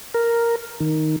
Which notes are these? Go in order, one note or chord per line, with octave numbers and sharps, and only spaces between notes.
A#4
D#3